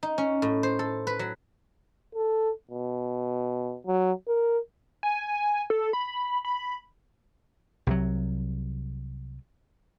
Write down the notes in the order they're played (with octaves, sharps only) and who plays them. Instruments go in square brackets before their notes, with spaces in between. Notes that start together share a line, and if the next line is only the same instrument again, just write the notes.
[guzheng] D#4
C#4
A2
C5
A4
B4
F#3
[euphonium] A4
B2
F#3
A#4
[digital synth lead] G#5
A4
B5
B5
[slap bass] C2 C3 F#3